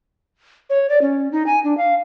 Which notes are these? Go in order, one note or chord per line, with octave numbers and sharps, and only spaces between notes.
C#5
D5
C#4
D#4
G#5
D4
F5